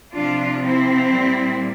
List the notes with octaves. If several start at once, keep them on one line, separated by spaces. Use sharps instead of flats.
C3 F3 D4 F4
C4 E4
A#2 G3